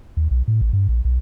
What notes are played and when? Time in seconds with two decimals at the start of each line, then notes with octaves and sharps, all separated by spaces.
0.17 D#2
0.31 B1
0.48 A2
0.61 A1
0.73 G2
0.89 A#1
1.05 B1